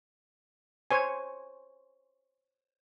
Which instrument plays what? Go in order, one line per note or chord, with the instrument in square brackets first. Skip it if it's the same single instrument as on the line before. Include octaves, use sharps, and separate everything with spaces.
[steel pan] C5 C#5 G#5